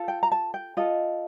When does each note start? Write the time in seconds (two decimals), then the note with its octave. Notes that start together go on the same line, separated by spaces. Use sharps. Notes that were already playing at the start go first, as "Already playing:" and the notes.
Already playing: F4 A4
0.08 G5
0.23 A#5
0.32 A5
0.54 G5
0.77 F4 A4 D#5